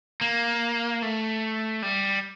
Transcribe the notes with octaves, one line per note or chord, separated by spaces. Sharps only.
A#3
A3
G3